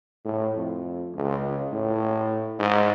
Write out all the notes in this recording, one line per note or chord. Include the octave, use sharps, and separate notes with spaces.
A2
F2
C#2
A2
G#2